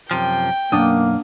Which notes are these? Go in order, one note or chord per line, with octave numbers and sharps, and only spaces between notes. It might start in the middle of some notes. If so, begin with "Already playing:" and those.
F#2 C3 F3 G5
B1 F#2 A#3 D4 F#5 D#6